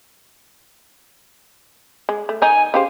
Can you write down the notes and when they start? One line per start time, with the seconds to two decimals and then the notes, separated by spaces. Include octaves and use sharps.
2.09 G#3
2.29 A3
2.42 D#3 D#4 G#5
2.74 C#3 G4 C5 F5